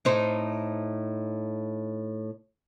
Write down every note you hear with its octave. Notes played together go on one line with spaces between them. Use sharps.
A2 D#4 C5